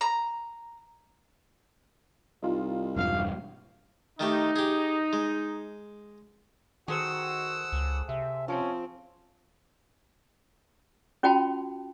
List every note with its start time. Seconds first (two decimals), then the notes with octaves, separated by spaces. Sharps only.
0.01 A#5
2.42 C2 D#4 F4
2.96 E1 G2 F5
4.20 D#3 A3 D#4 G4
4.56 G4 G#4
5.13 G#3
6.88 D#3 F#4 G#4 A4 C5 F#5 E6
7.72 C#2
8.09 C3 E5
8.48 F3 C4 C#4
11.23 C#4 F4 F#4 G5 A5 B5